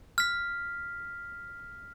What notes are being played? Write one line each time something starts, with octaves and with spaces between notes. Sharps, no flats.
F6 B6